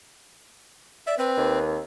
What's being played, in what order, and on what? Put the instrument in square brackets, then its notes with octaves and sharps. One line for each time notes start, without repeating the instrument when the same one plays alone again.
[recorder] D5 [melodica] E5
[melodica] C4 [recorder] B4
[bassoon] D#2